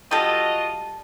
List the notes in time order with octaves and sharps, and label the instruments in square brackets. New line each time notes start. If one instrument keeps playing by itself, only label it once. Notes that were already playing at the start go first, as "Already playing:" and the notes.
[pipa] G3 A4 [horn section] F4 F#4 D#5